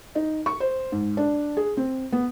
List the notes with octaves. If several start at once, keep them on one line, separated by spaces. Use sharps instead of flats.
D#4
C#6
C5
G#2
D4
G#4
C4
B3